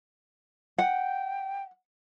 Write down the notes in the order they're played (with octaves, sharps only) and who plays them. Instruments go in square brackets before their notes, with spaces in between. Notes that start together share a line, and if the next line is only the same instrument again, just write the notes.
[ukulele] F#5 [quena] G5